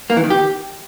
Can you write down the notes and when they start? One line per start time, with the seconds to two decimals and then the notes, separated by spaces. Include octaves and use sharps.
0.10 A#3
0.17 E3
0.23 D#3
0.30 G4